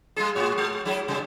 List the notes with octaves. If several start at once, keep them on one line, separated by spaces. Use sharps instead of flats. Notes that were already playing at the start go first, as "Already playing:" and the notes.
G3 G#3 G#4
A2 F#4 C#5
G#3
F#3 E4 G#4
C3 G3